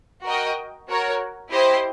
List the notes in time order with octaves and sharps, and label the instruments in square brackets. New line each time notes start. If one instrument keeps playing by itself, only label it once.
[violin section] F#4 A#4 D#5 G5
F#4 A#4 C#5
E4 G4 C5 D#5